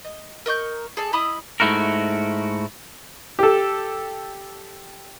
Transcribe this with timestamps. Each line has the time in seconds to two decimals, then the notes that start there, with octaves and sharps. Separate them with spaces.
0.05 D#5
0.46 A#4 D#5 C#6 G6
0.97 G#4 A4 D5
1.13 E4 D#5 B5 D#6
1.60 G#2 A3 E4 F#4 A#4
3.39 G4 A4